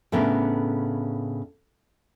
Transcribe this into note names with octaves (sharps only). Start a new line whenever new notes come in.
A2 C#3 B3 D4 A#4